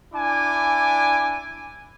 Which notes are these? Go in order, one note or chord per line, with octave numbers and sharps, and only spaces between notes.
D4 E4 G#5 D6